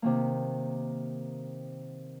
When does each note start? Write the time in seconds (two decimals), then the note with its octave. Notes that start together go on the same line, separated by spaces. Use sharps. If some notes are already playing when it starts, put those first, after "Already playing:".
0.02 C3 D#3 A#3